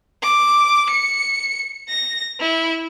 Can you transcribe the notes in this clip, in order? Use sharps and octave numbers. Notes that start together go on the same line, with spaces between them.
D6
C#7
A#6
E4